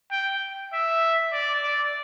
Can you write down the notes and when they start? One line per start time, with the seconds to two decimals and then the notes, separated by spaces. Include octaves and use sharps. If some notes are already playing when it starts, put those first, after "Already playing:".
0.11 G5
0.73 E5
1.32 D5
1.62 D5